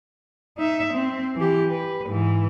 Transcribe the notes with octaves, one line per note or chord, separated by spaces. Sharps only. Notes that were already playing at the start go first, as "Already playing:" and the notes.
D#4 E5
C4
E3 G4
B4
G#2 E3